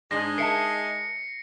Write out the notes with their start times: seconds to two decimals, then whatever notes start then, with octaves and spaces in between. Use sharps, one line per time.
0.11 G#2 G#3 D4 D#4 G#4 A#6
0.38 A#4 E5 A5 C7 C#7